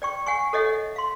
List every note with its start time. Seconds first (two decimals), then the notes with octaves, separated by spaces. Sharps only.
0.02 D5 G5 C#6
0.26 F#5 G#5 C#6
0.53 A4 C#5 D#5 E5 F#5
0.96 F5 C6